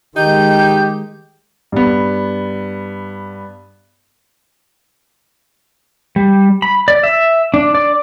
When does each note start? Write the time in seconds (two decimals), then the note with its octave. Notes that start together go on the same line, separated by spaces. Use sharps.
0.16 D#3 G#3 D#4 G4 G6
1.72 G2 B3
6.16 G3
6.62 B5
6.88 D5
7.03 E5
7.54 D4
7.75 D5